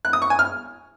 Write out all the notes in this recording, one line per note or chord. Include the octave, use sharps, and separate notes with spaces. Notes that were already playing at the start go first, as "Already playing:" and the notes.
F#6
D#6
C#6
G#5
F6